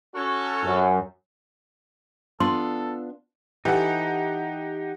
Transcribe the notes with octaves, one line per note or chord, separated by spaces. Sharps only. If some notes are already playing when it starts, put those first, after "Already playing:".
C#4 F#4 A4
F#2
B3 D4 F4 A4 C6
E3 D#4 G4 A4 F#5